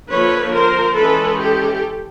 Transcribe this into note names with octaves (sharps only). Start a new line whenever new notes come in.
D3 F3 A#3 B4 C#5
A#4 C5
E3 G#3 C#4 A4 B4
G4 A4